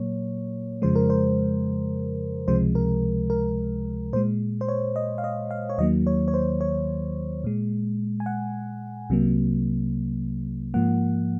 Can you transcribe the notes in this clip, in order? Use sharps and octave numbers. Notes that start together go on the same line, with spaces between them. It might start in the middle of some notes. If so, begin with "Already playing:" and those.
Already playing: A#2 F#3 A#3 C#5
F2 C#3 F3 G#3 C5
A#4
C5
C#2 C3 F3 G#3 C5
A#4
A#4
A#2 G#3 C5
C5
C#5
D#5
F5
D#5
F5
C#5
D#2 D#3 F#3 A#3 D#5
C#5
C#5
C5
C#5
A#2 G#3
G#5
F#5
C2 C3 F#3 A#3
G#2 F3 A#3 F#5